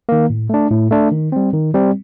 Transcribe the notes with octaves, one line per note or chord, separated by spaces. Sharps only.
D#3 A#3
A2
A3 D4
A2
A3 D4
D#3
G3 C4
D#3
G3 C4